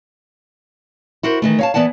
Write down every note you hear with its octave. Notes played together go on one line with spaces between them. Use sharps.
E4 F#4 A#4 C5
D#3 E3 A3
C#5 F5 A5
E3 A3 B3 D5 F#5 A5